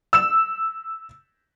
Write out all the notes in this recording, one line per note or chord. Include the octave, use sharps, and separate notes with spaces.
E6 E7